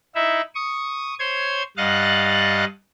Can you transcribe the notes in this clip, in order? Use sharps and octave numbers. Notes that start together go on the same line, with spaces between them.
D#4 E4 E5
C#6 D#6
C5 C#5 C6 G#6
G2 D#5 F5 F#5 F#6 A6